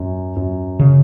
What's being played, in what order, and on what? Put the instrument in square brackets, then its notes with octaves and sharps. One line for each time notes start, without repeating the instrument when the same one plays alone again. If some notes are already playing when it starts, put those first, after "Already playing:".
Already playing: [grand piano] F#2
F#2
[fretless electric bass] C#3